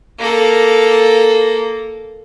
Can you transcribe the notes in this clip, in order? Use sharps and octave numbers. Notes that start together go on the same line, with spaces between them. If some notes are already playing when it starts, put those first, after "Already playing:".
A#3 A4